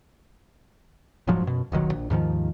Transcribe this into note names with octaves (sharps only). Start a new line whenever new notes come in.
D#1 G#2 F3 F#3
F#2 B2
D#1 B1 D#3 F#3
A#1
D#2 G#2 D#3 F3